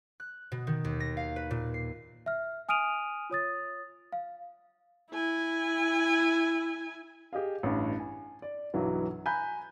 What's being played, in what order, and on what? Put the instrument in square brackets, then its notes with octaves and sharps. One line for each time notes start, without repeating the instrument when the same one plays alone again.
[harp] F#6
B2
D#3
D#2
A#6
F5
B4
A#2
C7
[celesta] E5 F6
G#5 D#6 F6 D7 D#7 F7
F4 C#5 D#6 A6
F5
[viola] E4 G#5
[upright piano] G4 G#4 D#5 F5
A1 G2
G#5
D5
B1 G2 E3 F#3
G#5 A#5 B5 F#6 G6